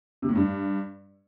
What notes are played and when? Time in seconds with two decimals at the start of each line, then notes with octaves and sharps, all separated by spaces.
0.22 C3
0.29 A2
0.35 G2